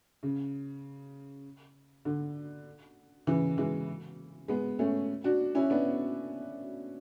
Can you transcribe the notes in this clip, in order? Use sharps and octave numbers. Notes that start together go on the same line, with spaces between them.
C#3
D3
C#3 E3
E3 G#3
G#3 B3
A3 C#4
D4 F#4
C#4 E4
B3 D4